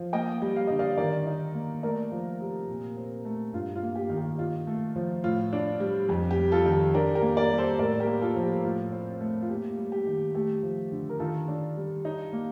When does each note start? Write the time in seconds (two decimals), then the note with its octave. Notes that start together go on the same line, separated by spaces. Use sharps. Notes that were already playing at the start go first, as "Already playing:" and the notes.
Already playing: F3
0.13 A#3 D#5 G5
0.42 G3
0.56 F5
0.67 D3 D#5
0.79 D5 F5
0.98 D#3 A#4 D5
1.26 D#4
1.55 A#3
1.83 A3 A#4 D5
2.12 F3
2.41 C3
2.68 A#2
2.97 C4
3.25 A3
3.53 G2 F4
3.75 F4
3.82 A#3
3.96 G4
4.10 D#3
4.18 G4
4.38 D#4 F4
4.67 A3
4.96 F3
5.24 A2 F4
5.53 D4
5.80 G3
6.09 F2 G4
6.31 G4
6.38 G3
6.52 F4 A4
6.66 D#3
6.72 G4
6.94 D4 G4 A#4
7.15 G4 A#4
7.22 A#3
7.37 A#4 D5
7.51 G3
7.58 A4 C5
7.79 A2 A#4 D5
8.00 G4 A#4
8.07 A#3
8.21 F4 A4
8.36 F3
8.43 G4
8.65 A2 F4
8.92 C4
9.21 A3
9.42 F4
9.49 A#3 G4
9.78 G3
9.92 G4
10.07 D#3
10.35 A3 G4
10.63 F3
10.92 D3
11.09 A#4
11.20 D#3 F4 A4
11.48 D4
11.77 G3
12.05 D#4
12.33 A#3